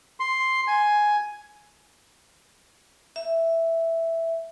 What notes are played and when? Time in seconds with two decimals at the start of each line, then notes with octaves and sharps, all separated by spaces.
0.20 C6
0.67 G#5
3.16 E5